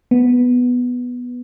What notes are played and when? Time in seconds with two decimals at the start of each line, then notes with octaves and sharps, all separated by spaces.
0.11 B3